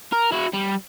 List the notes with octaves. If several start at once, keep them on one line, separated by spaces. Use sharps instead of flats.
A#4
E4 F#4
G3